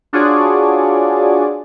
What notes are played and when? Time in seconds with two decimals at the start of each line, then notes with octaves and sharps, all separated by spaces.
0.13 D4 F4 F#4 G#4 C#5 D5